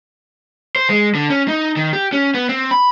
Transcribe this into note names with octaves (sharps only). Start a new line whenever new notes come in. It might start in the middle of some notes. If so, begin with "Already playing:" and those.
C5
G#3
D3
C#4
D#4
D#3
G4
C#4
B3
C4
B5